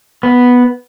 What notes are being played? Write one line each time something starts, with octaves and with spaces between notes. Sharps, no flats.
B3